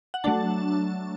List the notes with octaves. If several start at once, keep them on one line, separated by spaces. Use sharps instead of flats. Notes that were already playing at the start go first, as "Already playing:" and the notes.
F#5
F#3 A3 D4 A5